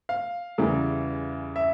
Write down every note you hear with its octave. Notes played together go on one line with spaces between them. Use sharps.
F5
E2 C#3 E3 G3
E5